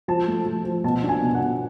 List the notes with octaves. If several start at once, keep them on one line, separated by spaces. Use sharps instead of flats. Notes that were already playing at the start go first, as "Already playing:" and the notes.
F3 A5
A3
F3
F3
B2 A5
D4
G#5
B2
F#5
B2